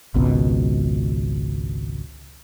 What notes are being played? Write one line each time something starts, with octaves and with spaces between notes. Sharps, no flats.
G#1 C#2 B2